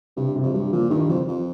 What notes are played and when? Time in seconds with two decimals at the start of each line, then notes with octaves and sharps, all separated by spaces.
0.17 G2 C3
0.36 C3
0.43 F2
0.54 G2 G3
0.72 A#2 F3
0.90 G2 D#3
1.09 F2 F3
1.28 F2